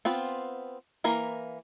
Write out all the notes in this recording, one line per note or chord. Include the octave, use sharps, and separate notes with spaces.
B3 C4 F4
E3 A#3 A#4